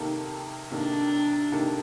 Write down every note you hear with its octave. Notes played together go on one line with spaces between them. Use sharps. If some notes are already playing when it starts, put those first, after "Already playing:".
Already playing: C3 D#3 A#3 D#4 A4
C3 D#3 A#3 D4 D#4 A4
C3 D#3 A#3 D#4 A4